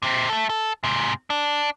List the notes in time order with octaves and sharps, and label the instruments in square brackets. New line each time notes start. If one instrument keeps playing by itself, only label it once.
[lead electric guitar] A#2 C4
A3 A4
A4
G#2 C3
D4